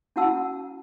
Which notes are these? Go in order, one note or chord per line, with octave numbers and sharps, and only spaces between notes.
C#4 E4 F#4 F#5 A5 E6